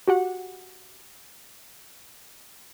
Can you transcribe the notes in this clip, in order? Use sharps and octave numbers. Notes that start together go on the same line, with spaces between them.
F#4 G4 F#5